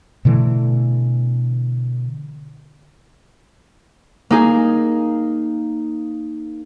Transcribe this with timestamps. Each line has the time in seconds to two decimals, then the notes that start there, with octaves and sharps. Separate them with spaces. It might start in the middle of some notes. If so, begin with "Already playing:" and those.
0.25 B2 D3 E3 A3
4.30 A#3 D#4 G#4